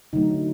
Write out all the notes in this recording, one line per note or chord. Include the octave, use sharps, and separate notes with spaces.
D3 F#3 A3 D#4